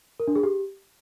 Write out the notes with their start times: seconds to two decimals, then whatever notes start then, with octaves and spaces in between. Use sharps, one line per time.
0.20 A#4
0.28 D4
0.35 G#4
0.43 G4